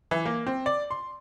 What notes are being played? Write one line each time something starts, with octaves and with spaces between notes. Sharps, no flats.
E3
A#3
C4
D5
C6